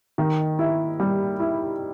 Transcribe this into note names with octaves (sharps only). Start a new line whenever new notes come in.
D#3
E4
G3
E4